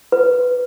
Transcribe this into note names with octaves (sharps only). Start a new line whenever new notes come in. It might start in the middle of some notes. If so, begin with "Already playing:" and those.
B4